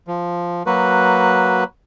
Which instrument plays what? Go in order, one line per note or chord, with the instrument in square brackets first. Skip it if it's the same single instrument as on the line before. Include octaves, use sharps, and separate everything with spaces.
[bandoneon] F3
F#3 A#3 F#4 B4